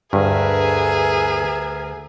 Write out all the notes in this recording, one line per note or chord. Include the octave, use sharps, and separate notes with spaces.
D2 G2 G#4 A#4 B4 E5